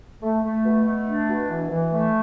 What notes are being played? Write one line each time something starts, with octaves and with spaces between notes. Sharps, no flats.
A3
A3
B2
A3
D4
B2
E3
E3
A3